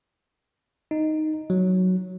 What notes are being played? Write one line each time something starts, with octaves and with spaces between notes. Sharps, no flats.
D#4
F#3